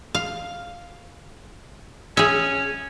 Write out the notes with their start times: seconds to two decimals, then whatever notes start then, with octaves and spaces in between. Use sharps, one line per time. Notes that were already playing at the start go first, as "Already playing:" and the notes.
0.15 F5
2.17 C#4 G#4 E5